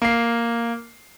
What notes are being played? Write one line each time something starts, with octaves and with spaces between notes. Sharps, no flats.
A#3 C7